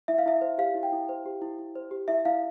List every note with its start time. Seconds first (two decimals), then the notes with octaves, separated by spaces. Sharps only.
0.08 E4 E5
0.18 F5
0.26 E4 E5
0.41 C5
0.58 G4 F5
0.75 E4
0.83 G5
0.92 E4
1.09 C5
1.26 G4
1.42 E4
1.59 E4
1.76 C5
1.91 G4
2.08 E4 E5
2.25 E4 F5